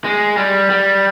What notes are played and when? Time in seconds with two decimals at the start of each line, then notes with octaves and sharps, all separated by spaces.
0.04 G#3
0.37 G3
0.70 G3